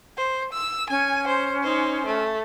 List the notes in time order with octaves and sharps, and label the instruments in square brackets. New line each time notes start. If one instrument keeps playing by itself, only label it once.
[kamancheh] C5
E6
[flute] C#4 [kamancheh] G#5
[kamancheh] C5
D#4 C5
A3